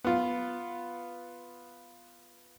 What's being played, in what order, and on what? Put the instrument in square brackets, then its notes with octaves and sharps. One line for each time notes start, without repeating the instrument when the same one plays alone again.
[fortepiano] B3 F4